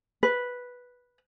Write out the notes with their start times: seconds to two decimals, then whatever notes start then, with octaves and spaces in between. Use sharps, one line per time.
0.23 B4